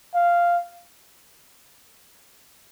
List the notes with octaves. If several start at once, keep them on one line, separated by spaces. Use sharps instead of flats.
F5